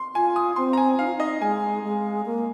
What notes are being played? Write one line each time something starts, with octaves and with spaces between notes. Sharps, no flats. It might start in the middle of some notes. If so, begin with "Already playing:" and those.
Already playing: C6
F4 G#5
D#6
C4 C6
A#5
G#5
D#4 F5
F4
D#4 D#5
G#3 G#5
G#3
A#3